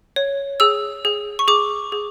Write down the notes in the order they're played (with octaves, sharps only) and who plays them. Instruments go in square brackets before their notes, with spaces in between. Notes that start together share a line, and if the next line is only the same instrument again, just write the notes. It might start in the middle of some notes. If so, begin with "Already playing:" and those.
[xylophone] C#5
G#4 E6
G#4
C#6
G#4 D6
G#4